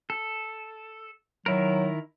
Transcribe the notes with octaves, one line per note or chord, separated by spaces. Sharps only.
A4
D#3 F#3 E4 A#4